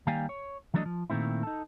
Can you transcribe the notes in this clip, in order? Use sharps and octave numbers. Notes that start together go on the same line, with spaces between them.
D#3 G3 A#3 F5 G5 G#5
C#5
E3 F#3 A3 D4 C5 D#5
F3
A#2 D#3 A3 C4 E4
D#4 A4